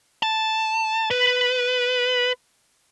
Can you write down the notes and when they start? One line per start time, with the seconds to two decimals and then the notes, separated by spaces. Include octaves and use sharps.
0.23 A5
1.11 B4